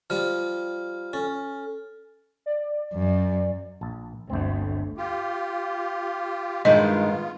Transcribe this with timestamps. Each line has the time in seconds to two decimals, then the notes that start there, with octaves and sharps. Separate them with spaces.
0.10 F3 G3 F4 F6
1.13 C#4 A4
2.46 D5
2.93 F#2
3.81 A#1 A5
4.30 G1 D2 C4
4.97 F4 G4
6.65 G2 D#3 G#3 B3 F4 D#5